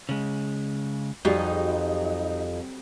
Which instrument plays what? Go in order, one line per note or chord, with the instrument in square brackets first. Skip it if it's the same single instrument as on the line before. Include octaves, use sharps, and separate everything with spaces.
[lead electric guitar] C#3 G#3
[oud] F2 [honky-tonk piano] F#3 G3 G#4 [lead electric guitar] D#4